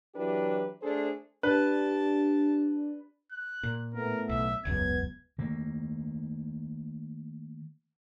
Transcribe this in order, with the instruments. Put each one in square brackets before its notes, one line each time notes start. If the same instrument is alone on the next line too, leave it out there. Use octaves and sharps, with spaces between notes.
[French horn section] E3 F#3 D4 E4 G4 B4
A3 D4 G#4 A4 C5
[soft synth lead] D4 [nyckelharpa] G4 A5 [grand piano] B4
[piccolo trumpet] F#6
[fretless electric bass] A#2
[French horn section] A2 A3 B3 [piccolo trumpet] A#4
[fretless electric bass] B1 [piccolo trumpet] E5
[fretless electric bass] E1 C#2 F#2 [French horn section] B3 [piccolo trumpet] G#6
[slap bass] D#3 A3 A#3